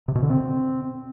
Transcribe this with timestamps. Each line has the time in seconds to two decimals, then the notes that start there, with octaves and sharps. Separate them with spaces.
0.08 C3
0.15 B2
0.23 D3
0.30 C4